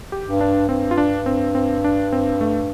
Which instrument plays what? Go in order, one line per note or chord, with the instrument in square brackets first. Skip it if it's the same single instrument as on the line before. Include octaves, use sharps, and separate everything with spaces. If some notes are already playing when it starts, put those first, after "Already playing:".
[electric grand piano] G4
[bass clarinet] G2
[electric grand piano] D4
[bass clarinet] G2 [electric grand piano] C4
[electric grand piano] F4
D4
C4
C4
D4
C4
A3